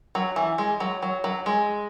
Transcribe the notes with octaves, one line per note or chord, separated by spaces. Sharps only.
F#3
E3
G#3
F#3
F#3
F#3
G#3